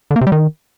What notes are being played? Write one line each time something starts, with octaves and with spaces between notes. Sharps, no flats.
D3
A#3
C3
G3
D#3